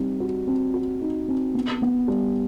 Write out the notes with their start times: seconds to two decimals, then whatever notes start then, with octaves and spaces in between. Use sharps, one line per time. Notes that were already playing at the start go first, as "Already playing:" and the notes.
Already playing: G3 C4 D#4
0.20 F#4
0.47 C4
0.74 F#4
1.01 D#4
1.28 C4
1.55 B3
1.82 B3
2.08 G3